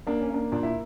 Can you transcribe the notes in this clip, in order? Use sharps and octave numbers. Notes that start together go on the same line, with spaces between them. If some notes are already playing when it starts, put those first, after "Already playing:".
A#3 D4
C#4
A#3 D4
A#2 D4
E4